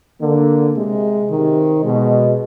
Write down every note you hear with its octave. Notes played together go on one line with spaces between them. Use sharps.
D3 A#3
C3 G#3
C3 D#3
B2 G#3